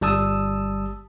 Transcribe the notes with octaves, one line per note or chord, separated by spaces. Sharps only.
G1 G3 A5 D#6 E6